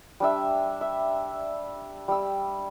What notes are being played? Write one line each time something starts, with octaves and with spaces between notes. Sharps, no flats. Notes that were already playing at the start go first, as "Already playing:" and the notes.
G3 D4 E5
E5
G3 E6